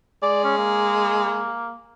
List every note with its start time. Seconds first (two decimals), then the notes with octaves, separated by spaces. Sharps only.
0.23 G#3 D5
0.44 C#4
0.58 A#3